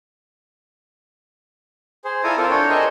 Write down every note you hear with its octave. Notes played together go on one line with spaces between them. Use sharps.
G#4 C5
E4 F4 A4 D5 G#5 A#5
C4 F4 A4 A#4 D5
D4 C#5 G5
G#4 A#4 C5 D#5 E5